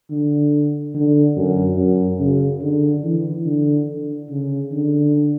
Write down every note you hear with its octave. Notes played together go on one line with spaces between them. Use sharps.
D3
D3
F#2
F#2
C#3
D3
E3
D3
D3
C#3
D3